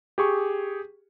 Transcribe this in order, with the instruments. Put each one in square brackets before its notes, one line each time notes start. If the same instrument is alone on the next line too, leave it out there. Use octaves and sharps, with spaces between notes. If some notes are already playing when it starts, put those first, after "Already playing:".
[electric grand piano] G4 G#4 C#6